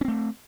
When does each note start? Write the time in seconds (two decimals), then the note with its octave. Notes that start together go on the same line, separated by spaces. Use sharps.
0.01 C#4
0.05 C4
0.08 A3